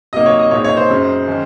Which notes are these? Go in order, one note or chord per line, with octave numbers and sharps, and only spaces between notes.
C3 F#3 A#3 D#4 D#5
C#5
D#5
A#2 G#3 C4 D#4 C#5
C#5
C5
F#2 C#3 G#3
D#3 G#3 C#4